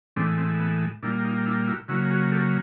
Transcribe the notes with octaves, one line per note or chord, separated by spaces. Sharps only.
A2 E3 G#3 C4 D4
C4
B3
A#2 G3 A#3 D4 E4
D#4 F4
D4 E4
E4 F#4
C#3 F#3 A#3 E4 F#4
F#4 G#4
G4 A4